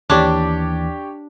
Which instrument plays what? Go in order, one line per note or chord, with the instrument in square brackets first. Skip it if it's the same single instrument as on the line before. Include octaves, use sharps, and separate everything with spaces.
[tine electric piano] D#2 E3 [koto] D4 [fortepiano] G4 C#5 D5